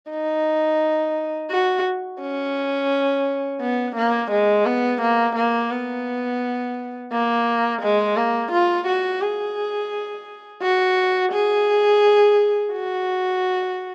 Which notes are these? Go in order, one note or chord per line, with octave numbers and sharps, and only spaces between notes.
D#4
F#4
C#4
B3
A#3
G#3
B3
A#3
A#3
B3
A#3
G#3
A#3
F4
F#4
G#4
F#4
G#4
F#4